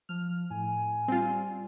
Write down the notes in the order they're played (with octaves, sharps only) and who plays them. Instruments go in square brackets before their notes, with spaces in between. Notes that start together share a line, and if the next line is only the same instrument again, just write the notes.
[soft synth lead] F3 [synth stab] F6
[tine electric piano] A2 [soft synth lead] G#5
[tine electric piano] G3 [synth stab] C4 F4